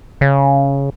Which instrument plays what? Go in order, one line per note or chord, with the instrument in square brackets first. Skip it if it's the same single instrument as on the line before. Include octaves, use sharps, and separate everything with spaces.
[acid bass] C#3